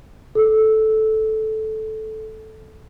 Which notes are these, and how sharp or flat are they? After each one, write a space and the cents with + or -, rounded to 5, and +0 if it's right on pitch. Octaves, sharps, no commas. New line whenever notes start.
A4 -10